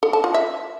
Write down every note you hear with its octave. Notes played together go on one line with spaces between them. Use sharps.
A4
A5
F4
E5